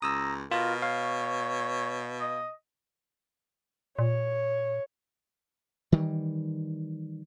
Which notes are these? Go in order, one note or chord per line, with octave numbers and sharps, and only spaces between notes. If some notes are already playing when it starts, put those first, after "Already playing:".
C#2 A#5 D#6 E6
B2 F4 A#4
C#5 F5
D#5
A#2 C#5
D#3 E3 G3